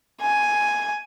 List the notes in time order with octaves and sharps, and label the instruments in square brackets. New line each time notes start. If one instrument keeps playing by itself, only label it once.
[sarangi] G#5